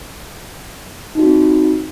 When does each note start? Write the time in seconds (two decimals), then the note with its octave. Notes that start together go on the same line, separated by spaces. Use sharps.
1.15 D#4
1.19 F#4
1.23 C4
1.27 F4